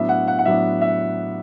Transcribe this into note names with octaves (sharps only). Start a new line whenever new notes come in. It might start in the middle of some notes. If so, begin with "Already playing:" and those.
Already playing: A2 F#3 B3 D4 E5
F#5
F#5
F#5
A2 F#3 B3 D4 E5
E5